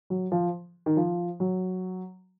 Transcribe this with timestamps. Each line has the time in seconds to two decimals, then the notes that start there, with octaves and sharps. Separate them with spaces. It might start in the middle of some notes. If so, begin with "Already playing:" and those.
0.10 F#3
0.32 F3
0.86 D#3
0.97 F3
1.40 F#3